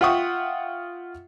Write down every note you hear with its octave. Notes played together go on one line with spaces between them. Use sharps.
F4 E5 F#5 G5 C#6 D#6